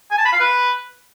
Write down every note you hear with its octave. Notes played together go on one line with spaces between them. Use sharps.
G#5
A5
B5
F5
B4